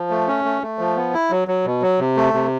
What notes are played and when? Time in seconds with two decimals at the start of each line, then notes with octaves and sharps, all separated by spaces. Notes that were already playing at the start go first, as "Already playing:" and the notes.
Already playing: F3
0.10 A3
0.27 C#4
0.45 A3
0.62 A3
0.79 F3
0.96 B3
1.14 E4
1.31 F#3
1.48 F#3
1.65 B2
1.82 F#3
1.99 C3
2.17 A3
2.33 C3